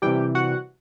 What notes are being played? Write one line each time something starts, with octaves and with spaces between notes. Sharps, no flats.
C3 E3 G3 G4 G5
F#4 F#5